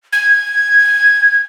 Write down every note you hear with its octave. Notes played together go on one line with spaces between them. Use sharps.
G#6